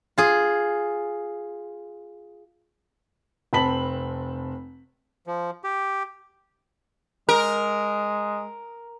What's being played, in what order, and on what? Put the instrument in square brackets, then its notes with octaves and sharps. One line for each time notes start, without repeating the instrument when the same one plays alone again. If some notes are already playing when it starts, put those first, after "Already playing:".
[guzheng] F4 G#4
[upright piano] F1 C4 A5 B5 B6 F#7
[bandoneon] F3
G4
[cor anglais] G#3 [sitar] A#4